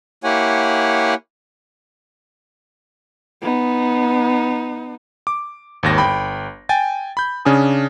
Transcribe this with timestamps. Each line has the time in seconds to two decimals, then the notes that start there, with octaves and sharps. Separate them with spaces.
0.24 A#3 E4 G4 C#5 F#5 G#5
3.42 B3 D#4
5.27 D6
5.83 G#1 D#2 A#6
5.98 G1 G5 B5
6.69 G5 G#5 A6
7.17 B5 G6
7.45 C#3 C#4 D4 G#5 D#6